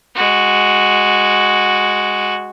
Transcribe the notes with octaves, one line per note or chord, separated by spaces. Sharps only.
G#3 F#4